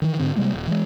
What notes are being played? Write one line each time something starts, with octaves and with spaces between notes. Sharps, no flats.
D#3 E3
G#2 D3 C4
C3 G3 G#3 A#3
D#1
E3 G#3